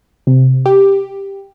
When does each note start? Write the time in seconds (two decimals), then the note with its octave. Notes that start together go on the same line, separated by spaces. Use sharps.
0.27 C3
0.66 G4